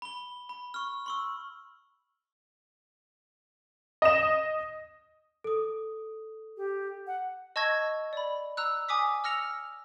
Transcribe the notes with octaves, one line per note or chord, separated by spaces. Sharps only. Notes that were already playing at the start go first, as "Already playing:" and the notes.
B5 G7
B5
C#6 F6
C6 C#6 E6
D#5 E7
A4 D#6
G4
F#5
D#5 A5 C#6 E6 G#6 A#6
D5 B5
A#5 E6 F#6
G#5 D6 D#6 B6
E6 F6 A#6 C#7 F7